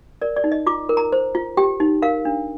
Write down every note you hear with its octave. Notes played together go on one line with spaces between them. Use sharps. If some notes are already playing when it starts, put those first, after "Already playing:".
A#4 D5
D5
D#4
D#5
F4 D6
A#4
A#5
C5
F4
G4 G5
D#4
A#4 F5
D4